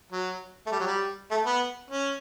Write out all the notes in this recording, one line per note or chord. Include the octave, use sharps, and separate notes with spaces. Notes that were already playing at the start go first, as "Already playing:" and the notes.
F#3
A3
G3
F#3
G3
A3
B3
C#4